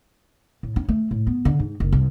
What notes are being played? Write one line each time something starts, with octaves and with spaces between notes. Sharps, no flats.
A2
C#4
A3
A2
B3
D3
G#2
F#1
C2